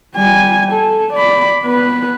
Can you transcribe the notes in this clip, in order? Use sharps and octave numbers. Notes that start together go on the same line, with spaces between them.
G3 G#5
A4
D5 B5
B3 B4